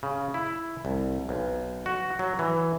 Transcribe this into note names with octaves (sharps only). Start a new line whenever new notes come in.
C#3
E4
C2
B1
F#4
F#3
E3